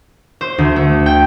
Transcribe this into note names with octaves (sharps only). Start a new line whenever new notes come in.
C5
D2
A3
G5